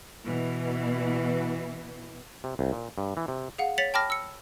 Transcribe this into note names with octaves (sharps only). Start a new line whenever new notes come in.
B2 E3
C3
C2
A#2
G2
E3
C3
G#4 F5 F#5
C#5 A6 B6 C#7 F7 F#7
G5 A5 B5 D6 F6 A#6
E6 C#7